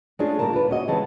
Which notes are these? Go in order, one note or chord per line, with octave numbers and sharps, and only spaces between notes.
G#3 A3 C#4 D4 F4 G#4
A#2 C#3 G3 A#4 A5
D4 F4 B4
A#2 C#4 F#4 D#5
C#3 E3 G#3 B3 C4 A5